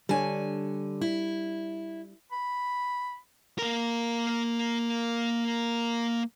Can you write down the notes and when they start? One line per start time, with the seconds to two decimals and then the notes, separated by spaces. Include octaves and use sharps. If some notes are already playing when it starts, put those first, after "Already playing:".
0.09 D3 G3 D4 C#5 G#5
1.01 E4
2.32 B5
3.59 A#3 A#4